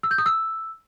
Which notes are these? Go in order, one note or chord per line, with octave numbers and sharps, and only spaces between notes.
E6
G6
D#6
E6